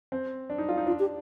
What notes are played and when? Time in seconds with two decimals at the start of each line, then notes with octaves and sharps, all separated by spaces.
0.12 C4
0.50 D4
0.58 D#4
0.69 F4
0.78 D#4
0.87 D4 F4
0.99 G4